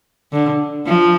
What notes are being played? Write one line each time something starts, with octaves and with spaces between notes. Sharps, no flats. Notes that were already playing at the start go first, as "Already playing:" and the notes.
D3
F3